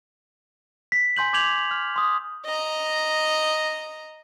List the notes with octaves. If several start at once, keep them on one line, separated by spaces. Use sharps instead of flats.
B6
G#5 C6 G6 F#7
D6 G6 G#6 F7 F#7
F6
C6 D#6
D#5 A#5